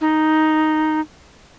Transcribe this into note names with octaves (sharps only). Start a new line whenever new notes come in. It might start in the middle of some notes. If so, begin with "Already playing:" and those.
D#4